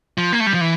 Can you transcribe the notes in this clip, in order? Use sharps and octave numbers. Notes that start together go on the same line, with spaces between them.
F3
A#3
A3
G3
F3
E3